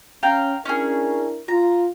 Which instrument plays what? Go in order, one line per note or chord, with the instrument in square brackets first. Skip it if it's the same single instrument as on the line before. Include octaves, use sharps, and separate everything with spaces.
[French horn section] C#4 [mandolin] F5 G5 A#5
[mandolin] C#4 G#4 [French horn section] D4 E4 A#4
[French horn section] F4 [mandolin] A#5